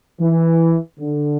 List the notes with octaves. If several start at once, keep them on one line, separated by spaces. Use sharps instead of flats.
E3
D3